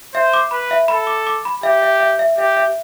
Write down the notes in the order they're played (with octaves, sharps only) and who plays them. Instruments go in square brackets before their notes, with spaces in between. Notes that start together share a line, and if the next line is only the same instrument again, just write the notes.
[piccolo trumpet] C5 [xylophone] E5
[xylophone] D6
[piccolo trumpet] B4 [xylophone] B5
[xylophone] E5
[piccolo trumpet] A4 [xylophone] B5
[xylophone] D6
D6
B5
[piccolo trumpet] G4 [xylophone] E5
[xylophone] E5
E5
E5
[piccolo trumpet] G4 [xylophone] E5
[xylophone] E5